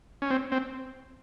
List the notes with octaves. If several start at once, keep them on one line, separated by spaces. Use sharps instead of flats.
C#4
C4
C4